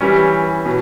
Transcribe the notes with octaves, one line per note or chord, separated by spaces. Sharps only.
E3 G3 C#4
B2